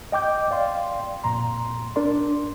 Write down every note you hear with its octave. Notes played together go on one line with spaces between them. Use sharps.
D#5 G5 D6 G6
D5 F5 G5 C6
F2 A#2 A#5 C6
D4 A#4 D5 C6